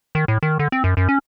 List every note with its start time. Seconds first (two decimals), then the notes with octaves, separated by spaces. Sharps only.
0.15 D#3
0.28 A2
0.43 D#3
0.59 D3
0.72 C4
0.84 F#2
0.97 F#2
1.09 C#4